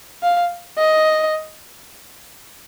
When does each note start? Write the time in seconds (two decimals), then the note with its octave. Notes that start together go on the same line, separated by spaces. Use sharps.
0.23 F5
0.78 D#5